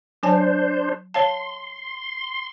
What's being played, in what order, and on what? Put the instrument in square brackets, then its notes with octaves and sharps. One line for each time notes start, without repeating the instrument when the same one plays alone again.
[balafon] F#3 G#5 A5 [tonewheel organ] D4 C5
[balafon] C#5 F5 A5 [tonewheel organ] C6